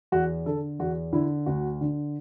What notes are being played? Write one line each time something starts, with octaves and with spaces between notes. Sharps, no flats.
E2 F#4
D3 A4
E2 F#4
D3 E4
D2 F#4
D3